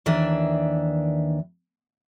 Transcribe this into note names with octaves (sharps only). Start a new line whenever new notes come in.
D#2 D#3 E3 D4 E5